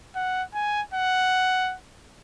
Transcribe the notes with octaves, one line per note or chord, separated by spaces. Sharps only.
F#5
G#5
F#5